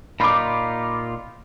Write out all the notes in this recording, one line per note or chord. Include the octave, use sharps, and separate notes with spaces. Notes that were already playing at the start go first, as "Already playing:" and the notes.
A#2 D#4 F4 B5 D6